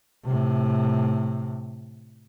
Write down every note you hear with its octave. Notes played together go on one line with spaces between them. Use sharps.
A2 C3